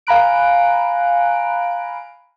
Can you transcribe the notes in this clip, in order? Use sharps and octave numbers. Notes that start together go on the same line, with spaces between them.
F5 G#5 A#5 B5 F#6 D7